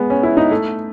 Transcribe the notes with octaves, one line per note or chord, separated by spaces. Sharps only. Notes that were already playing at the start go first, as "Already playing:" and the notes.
Already playing: G#3 B3
C#4
E4
D#4
A3